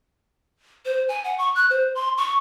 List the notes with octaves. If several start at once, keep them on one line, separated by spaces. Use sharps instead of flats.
C5
G#5
F#5
C#6
F#6
C5
C6
C#6